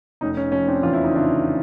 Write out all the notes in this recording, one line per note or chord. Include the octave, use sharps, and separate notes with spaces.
F1 C#4 D#4
C#4
F3 C#4
C4 D4
E2 F4
E4
D#4
C#3 D4 E4